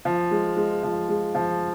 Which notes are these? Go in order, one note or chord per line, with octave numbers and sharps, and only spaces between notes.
F3
G#3
G#3
F3
G#3
F3